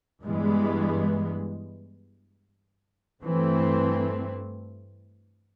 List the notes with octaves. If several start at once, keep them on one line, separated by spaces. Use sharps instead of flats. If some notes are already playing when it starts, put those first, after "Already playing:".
G2 E3 G#3 B3
G2 E3 A3 C4